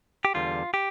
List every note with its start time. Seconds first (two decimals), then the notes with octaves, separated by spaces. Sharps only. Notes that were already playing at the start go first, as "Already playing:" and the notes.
0.25 G4
0.34 E2 D3 G3 F4
0.74 G4